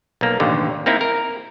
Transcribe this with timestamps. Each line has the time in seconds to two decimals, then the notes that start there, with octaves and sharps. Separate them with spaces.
0.21 B1 A#3
0.40 A1 D#2 D3
0.86 A#3 C4 D#4 E4
1.01 A#4